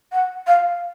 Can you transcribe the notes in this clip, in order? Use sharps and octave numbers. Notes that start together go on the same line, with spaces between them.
F#5
F5